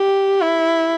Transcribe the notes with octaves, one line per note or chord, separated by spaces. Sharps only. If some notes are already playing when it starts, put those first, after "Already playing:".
Already playing: G4
E4